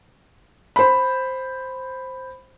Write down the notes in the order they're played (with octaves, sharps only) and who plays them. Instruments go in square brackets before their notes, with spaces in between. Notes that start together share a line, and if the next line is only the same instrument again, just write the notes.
[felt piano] C5 B5